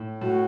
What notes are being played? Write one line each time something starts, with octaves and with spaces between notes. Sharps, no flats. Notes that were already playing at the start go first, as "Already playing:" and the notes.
Already playing: A2
A2 F#4